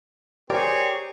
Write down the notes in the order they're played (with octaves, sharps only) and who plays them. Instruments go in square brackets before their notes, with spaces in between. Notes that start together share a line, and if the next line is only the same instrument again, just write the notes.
[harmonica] C4 G#4 C#5 [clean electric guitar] G4 A#4 D5